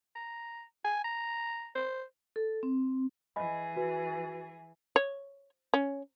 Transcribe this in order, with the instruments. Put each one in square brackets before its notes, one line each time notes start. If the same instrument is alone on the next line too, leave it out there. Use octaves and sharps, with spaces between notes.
[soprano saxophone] A#5
G#5
A#5
C5
[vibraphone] A4
C4
[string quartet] E3 G#4 [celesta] D#5 G#5 B5
[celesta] F#4 B4
[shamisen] C#5
C#4